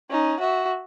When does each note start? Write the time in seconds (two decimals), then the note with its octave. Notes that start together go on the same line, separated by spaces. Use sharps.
0.10 C#4 D#4
0.40 F#4 E5